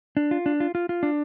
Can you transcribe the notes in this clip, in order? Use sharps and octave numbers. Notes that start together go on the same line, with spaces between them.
D4
F4
D4
F4
F4
F4
D4